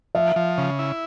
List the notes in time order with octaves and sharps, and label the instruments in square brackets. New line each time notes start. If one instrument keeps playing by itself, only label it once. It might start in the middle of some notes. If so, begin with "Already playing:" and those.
[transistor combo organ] F3 [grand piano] E5
[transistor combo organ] F3
C#3
E4